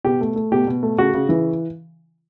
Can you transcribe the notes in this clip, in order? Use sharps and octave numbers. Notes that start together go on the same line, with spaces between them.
B2 G4
A3
A3
B2 G4
B2
A3
C#3 F#4
C#3
E3